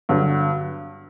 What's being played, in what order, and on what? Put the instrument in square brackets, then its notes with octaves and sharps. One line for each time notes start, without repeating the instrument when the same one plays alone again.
[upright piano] G2 D3 F#3